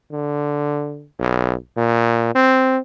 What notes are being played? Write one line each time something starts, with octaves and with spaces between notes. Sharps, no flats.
D3
B1
A#2
C4